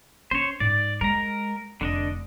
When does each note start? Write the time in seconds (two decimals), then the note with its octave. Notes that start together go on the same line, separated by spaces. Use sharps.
0.31 C#4 C5 C#5
0.60 G#2 D5
1.01 G#3 A#4 A#5
1.81 F1 D3 D4 D#5